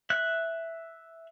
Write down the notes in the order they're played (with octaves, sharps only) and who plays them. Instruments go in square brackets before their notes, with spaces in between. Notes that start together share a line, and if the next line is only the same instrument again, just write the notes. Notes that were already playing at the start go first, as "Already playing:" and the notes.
[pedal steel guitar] E5 F#6